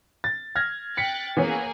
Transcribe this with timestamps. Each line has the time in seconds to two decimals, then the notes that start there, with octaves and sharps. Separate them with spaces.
0.24 A6
0.56 F6 G#6 A#6
0.97 G5 F#6 A6 B6 C#7
1.37 E3 A#3 B3 C#4 G#4 G#5